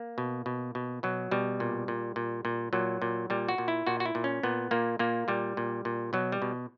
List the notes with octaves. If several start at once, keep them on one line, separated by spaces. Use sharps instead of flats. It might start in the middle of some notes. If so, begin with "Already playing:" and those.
Already playing: A#3
B2
B2
B2
B2 F#3
B2 G3
A#2
A#2
A#2
A#2
A#2 F#3
A#2
A#2 G3
F#4
A#2
E4
A#2 F#4
F#4
E4
A#2
C#4
A#2 B3
A#2 A#3
A#2 A#3
A#2 G3
A#2
A#2
B2 F#3
G3
B2